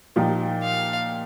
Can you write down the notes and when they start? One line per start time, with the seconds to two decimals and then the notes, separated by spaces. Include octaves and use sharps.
0.16 A#2 F3 D#4 G4
0.63 F5